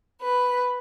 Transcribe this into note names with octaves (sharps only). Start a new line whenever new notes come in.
B4